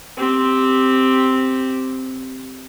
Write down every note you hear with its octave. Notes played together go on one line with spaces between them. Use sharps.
C4 G4